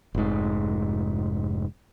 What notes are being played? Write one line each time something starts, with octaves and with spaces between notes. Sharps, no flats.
F1 G#2